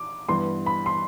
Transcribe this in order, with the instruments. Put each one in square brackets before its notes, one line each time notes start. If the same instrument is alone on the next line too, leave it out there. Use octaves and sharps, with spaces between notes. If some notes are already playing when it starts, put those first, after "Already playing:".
Already playing: [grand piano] D6
[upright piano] G2 E3 B3 [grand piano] C6
[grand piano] B5
C6